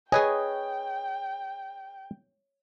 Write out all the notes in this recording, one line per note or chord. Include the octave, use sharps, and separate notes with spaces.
G#4 B4 C#5 D#5 G5 G#5